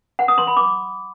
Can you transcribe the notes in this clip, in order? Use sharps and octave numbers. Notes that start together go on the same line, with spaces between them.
F#5
D#6
C6
B5
D6